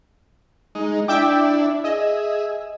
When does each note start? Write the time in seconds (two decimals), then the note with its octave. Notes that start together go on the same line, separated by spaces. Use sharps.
0.75 G#3 D#4
1.08 D4 E4 E5 G5 D6
1.84 G#4 D#5 E5